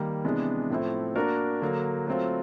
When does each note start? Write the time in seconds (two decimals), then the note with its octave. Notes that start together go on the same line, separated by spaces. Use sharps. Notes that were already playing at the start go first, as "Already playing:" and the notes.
Already playing: D#3 G3 A#3
0.24 C3 E3 G#3 B3 D4
0.70 A2 F3 A3 C4 E4
1.16 A#3 D4 F#4 A#4
1.62 D3 F#3 A#3
2.07 F#3 A3 C4 F4